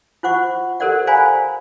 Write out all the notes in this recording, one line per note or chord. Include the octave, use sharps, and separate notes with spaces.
F4 C5 F#5 C#6
G4 A4 A#4 C5 D5 F#5
C5 D5 F5 G#5 A#5 B5